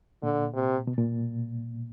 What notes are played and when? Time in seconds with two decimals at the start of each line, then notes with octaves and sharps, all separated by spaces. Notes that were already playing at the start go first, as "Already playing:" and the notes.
0.23 A#2 D3
0.54 C3
0.87 B2
0.98 A#2